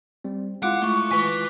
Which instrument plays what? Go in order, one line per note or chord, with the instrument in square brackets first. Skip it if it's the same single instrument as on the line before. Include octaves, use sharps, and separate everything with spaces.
[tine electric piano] G3 C4
[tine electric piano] G#3 E4 F4 [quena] F5 [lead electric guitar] F#5 [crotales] D6 F#6 D7
[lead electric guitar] A3 [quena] C#6
[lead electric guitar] B4 G#5 [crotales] B6